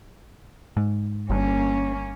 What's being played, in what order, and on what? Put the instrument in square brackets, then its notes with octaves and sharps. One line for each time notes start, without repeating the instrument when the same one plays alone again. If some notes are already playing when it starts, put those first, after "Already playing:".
[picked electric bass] G#2
[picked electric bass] G1 G2 [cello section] A#3 C#4